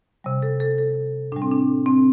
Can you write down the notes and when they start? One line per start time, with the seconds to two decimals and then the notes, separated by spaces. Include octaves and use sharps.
0.24 C3 G3
0.42 A4
0.60 A4
0.78 A4
1.32 A2 G3 D4
1.42 C4
1.52 D4
1.86 C4